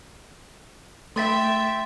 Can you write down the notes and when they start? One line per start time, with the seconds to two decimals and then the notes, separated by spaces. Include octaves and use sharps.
1.16 A3 E5 G5 C6 A6 B6